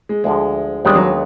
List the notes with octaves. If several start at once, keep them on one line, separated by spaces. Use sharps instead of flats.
G#3
D2 D3 F3 G#3
D#2 D#3 G3 G#3 B3 D4
F#3